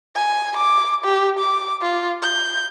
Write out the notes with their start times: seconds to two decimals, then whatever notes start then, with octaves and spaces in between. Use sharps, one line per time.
0.16 G#5
0.57 D6
1.05 G4
1.39 D6
1.82 F4
2.22 G6